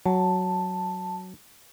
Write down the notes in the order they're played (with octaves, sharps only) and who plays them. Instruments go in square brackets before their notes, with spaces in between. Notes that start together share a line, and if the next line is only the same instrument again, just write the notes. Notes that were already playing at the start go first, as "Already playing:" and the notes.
[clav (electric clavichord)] F#3 [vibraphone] A5